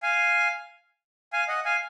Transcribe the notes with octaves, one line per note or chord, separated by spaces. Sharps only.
F5 G#5
F5 G#5
D#5 F#5
F5 G#5